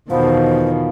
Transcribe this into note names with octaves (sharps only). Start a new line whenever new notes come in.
E2 B2 D#3 F3 B3 C5